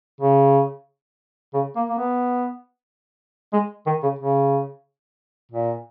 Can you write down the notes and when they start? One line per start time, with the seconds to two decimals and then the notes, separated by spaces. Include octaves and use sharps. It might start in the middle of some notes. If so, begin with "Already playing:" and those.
0.21 C#3
1.54 C#3
1.76 A#3
1.89 A#3
1.98 B3
3.53 G#3
3.86 D#3
4.03 C#3
4.19 C#3
5.52 A#2